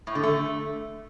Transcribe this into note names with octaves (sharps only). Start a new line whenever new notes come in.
A2
D3
A3